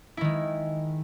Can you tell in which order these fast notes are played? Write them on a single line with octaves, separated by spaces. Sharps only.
E4 D#3 G#3